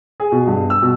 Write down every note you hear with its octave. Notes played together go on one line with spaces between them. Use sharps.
G#4
B2
G2
E6
B2